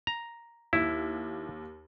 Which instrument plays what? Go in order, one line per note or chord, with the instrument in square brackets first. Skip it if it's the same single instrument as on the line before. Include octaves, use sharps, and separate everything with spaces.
[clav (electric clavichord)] A#5
[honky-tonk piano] D#2 [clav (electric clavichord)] E4